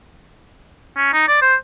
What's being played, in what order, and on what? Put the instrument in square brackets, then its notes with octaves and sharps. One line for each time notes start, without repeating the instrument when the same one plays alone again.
[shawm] C#4
D#4
D5
C5